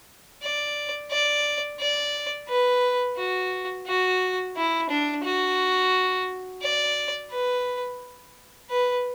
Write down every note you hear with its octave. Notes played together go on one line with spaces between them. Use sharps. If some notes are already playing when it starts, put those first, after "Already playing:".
D5
D5
D5
B4
F#4
F#4
E4
D4
F#4
D5
B4
B4